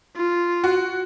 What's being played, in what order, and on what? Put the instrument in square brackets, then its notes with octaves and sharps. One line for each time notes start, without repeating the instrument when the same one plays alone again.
[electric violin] F4
[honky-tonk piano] F#4